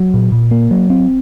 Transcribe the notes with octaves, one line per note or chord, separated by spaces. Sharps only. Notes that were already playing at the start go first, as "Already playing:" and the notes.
Already playing: F#3
A#2
A#2
A#3
F#3
C4